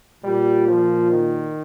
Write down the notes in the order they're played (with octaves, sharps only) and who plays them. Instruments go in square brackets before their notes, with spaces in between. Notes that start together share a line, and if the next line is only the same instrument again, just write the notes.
[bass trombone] A#2 [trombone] G3
[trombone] F3
D#3